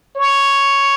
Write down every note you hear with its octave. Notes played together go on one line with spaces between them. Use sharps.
C#5